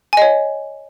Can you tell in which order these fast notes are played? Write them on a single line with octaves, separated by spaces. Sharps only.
G#5 D#5 C#5